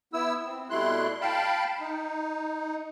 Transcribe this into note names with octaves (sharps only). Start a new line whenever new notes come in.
B3 E4 E6
C4
B2 G3 A3 E4 C6 F#6
F5 G5 A5 B5
D#4